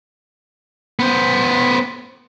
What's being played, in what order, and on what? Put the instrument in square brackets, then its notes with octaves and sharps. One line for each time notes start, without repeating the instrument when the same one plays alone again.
[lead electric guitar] B3 C5